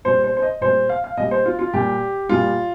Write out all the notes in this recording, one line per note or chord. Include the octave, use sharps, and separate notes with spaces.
A#2 G3 C5
C5
C5
D#5
A#2 G3 C5
F5
F5
A#2 G3 D#5
C5
F4
F4
A#2 G3 G4
A#2 G3 F4